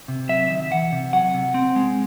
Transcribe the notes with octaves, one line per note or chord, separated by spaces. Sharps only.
C3
F#3 E5
D#3
E3 F#5
C3
F#3 F#5
C3
C4
G#3